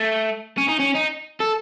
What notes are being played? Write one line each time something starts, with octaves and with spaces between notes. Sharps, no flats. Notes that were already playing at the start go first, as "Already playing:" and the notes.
Already playing: A3
C#4
D#4
C#4
D#4
A4